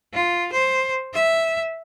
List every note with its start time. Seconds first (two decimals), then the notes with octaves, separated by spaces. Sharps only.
0.14 F4
0.52 C5
1.14 E5